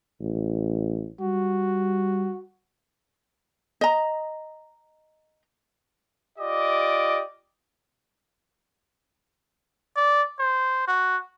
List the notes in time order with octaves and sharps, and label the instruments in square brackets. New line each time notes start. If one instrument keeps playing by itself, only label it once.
[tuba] A1
[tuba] G3 [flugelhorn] F#4
[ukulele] D#5 A#5
[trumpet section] F4 G4 D5 D#5 D6
[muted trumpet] D5
C5
F#4